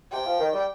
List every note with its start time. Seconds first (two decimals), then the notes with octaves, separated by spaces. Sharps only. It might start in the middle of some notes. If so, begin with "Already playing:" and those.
0.12 C3 G5
0.26 F3
0.39 D#3
0.53 G3